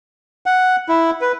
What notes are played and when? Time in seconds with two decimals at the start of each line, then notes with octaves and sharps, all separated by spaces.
0.46 F#5
0.89 E4
1.21 B4